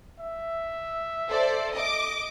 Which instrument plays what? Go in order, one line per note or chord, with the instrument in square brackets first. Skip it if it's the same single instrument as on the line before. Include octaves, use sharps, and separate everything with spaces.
[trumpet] E5
[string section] A4 C5 D5
D#5 D6